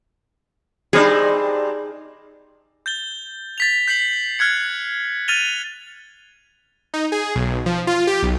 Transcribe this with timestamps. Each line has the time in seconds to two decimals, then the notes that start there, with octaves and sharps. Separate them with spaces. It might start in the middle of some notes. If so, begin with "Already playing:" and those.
0.93 G3 C4 D4 D#4 G#4
2.86 G6 A6 G7
3.58 A6 B6 F7
3.88 G6 B6 C7 F#7
4.39 F6 F#6 G#6 C#7
5.28 F6 A6 D#7 F7 G7
6.94 D#4
7.12 G#4
7.35 B1
7.66 F3
7.87 F4
8.07 G4
8.23 B1